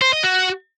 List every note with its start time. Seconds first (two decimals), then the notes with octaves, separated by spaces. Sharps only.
0.02 C5
0.13 D#5
0.24 F#4